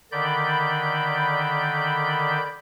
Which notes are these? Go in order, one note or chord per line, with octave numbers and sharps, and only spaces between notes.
D3 D#3 D5 B5 G6